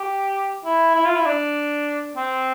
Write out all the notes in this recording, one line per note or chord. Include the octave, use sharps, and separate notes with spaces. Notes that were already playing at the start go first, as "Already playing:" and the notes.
Already playing: G4
E4
E4
F4
E4
D4
C4